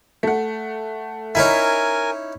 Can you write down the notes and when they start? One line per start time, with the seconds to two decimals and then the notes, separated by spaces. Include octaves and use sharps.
0.23 A3 F#5
1.35 C#4 D#4 E4 A#4 G#5 B6